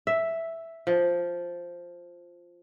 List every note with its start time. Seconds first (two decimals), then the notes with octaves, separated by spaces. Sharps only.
0.07 E5
0.87 F3